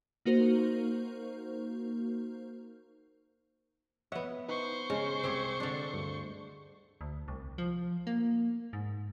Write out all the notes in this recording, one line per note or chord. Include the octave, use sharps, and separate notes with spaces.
A#3 D#4 F#4 A#4 C5
B3 C#5 D#5 E5 F#5
D#4 B4 C5 C#6
C#3 G#3
C2 C4 G4 C#5
D3 D4
D2 G2
D2
C2
F3
A#3
G#2